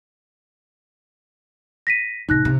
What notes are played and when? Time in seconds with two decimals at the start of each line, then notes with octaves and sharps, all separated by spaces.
1.87 A#6 B6 D#7
2.29 A1 C3 D#4 F#6 A#6
2.45 C3